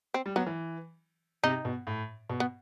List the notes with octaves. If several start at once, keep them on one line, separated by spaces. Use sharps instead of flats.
C4
G3
F#3 B3
E3
C3 D#4
B2
A2
B2
B3